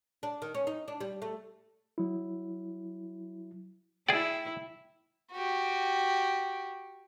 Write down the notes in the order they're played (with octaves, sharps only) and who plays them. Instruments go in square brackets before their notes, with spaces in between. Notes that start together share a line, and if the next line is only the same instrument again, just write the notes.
[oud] D4
D#3
C#4
D#4
D4
G3
A3
[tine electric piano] F#3 E4
[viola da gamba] E4 [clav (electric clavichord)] G#4 D5 [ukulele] G5
[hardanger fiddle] F#4 G4